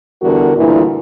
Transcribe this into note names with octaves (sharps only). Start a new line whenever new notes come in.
E2 D3 G3 F#4 A#4
D2 G2 A#2 E3